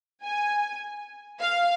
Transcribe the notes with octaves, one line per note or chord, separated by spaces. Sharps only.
G#5
F5